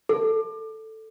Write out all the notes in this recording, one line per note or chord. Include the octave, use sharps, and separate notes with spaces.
A4